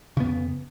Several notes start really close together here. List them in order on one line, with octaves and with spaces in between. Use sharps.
C#3 B3 F2